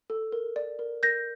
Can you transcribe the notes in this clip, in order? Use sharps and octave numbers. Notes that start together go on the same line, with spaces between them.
A4
A#4
D5
A#4
A#4 G6 A#6